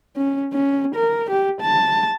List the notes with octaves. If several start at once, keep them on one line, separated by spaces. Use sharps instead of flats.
C#4
C#4
A#4
G4
A5